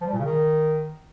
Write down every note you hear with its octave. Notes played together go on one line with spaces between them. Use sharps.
F3
G3
A#2
C#3
D#3